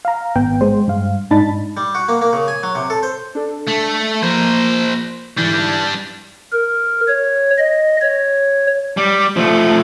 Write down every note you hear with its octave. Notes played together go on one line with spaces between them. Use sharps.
F5 A#5
G#1 B3 G5
G#3 C5
G2 F5
G#2 D4 D#4 A5 B5 A6
G3
F#4
A#3
A#3
C#3
G#5
F#3
C3
A4
C5
D4 A4
A3
F3 A#3 A#4 C5
G#2 D3 E3 G3 D4
A#4
C#5
D#5
C#5
G3
F3 A3